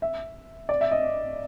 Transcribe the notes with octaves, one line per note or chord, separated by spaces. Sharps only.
E5
D5
E5
D#5